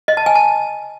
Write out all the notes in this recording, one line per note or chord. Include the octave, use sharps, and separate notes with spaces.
D#5
A5
G#5
A5